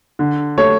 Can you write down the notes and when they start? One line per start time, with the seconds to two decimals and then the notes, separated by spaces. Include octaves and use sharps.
0.19 D3
0.58 A3 C#5